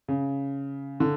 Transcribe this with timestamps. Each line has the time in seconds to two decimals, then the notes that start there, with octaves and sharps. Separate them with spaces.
0.08 C#3
1.00 D3